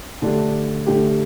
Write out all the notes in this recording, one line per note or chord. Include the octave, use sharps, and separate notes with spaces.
D3 A3 D4 G4
D3 A3 D4 G4